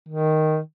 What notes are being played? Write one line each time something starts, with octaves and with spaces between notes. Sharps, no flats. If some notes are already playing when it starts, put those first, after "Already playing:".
D#3